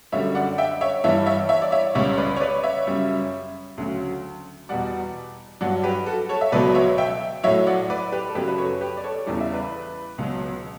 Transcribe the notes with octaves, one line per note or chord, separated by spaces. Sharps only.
F#2 D3 G3 C#5 E5
D5 F#5
E5 G5
C#5 E5
G2 E3 G3 C#5 E5
C#5 E5
C#5 E5
D5
C#5 E5
C#2 C#3 G3 C#5 E5
B4 D5
C#5
B4 D5
C#5 E5
F#2 C#3 G3
D2 C#3 F#3
E2 B2 G3 D5 F#5
G2 F#3 D5 F#5
G4 B4
F#4 A4
A4 C#5
E5
C#2 B2 F#3 B4 D5
C#5 E5
E5 G5
A2 F#3 C#5 E5
D5 F#5
B4 D5
G4 B4
A4
F#2 C#3 F#3 G4 B4
B4
A4 C#5
G4 B4
D5
A4 C#5
E2 C#3 E3 G3 D5
E5
B4 D5
C#2 B2 F#3